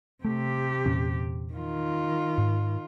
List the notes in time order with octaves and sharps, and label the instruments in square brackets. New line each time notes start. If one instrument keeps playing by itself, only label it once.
[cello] C3 G4 [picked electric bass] A3
[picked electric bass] E2 A#2 C#4
[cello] D#3 F4
[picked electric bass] G#2